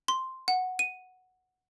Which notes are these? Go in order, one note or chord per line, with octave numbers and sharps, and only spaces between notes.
C6
F#5
D#7